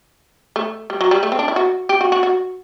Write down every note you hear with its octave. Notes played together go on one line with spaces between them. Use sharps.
A3
G3
F#3
G3
A3
C4
D4
E4
F#4
G4
F#4
F#4
F#4